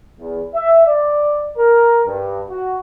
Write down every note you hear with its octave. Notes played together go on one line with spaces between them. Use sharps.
E2
E5
D5
A#4
G2
F#4